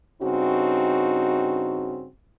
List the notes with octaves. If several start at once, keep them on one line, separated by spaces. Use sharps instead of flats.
G2 C#3 C4 D#4 F#4